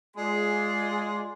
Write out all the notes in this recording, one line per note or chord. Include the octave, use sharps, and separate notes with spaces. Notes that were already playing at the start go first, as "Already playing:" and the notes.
G#3 F4 G#4 D5 C6